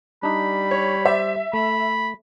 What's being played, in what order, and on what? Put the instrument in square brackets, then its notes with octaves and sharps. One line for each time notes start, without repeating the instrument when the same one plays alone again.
[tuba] G3 [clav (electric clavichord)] D4 D#4 [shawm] B5
[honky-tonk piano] C#5
[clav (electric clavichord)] C5 D5 [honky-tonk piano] E5
[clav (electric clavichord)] A3 [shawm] B5